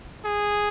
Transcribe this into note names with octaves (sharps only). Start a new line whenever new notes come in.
G#4